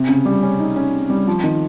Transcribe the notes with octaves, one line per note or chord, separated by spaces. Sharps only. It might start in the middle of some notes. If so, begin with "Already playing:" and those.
Already playing: C3
C#3
G3
C#4
D#4
C#4
C4
G3
F3
D#3